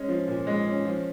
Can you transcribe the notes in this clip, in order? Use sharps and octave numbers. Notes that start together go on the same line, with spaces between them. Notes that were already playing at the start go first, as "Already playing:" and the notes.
Already playing: G#3 C#4
F3
A#2
G#3
C#4
F3